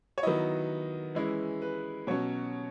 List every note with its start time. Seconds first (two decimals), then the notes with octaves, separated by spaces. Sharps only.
0.18 C#5
0.23 D#3 F#3 B3 E4 D#5
1.15 E3 G#3 C#4 E4
1.62 B4
2.07 B2 F#3 C#4 C#5